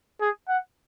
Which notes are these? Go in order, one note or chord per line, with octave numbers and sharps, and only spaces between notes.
G#4
F#5